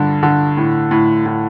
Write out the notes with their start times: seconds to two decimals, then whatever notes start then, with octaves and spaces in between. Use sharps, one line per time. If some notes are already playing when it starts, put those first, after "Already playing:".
Already playing: G2 D3
0.23 D3
0.57 A2
0.91 A2
1.26 A2